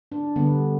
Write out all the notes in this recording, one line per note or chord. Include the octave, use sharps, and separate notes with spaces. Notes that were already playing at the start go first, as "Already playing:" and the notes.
D4
D3 G3 B3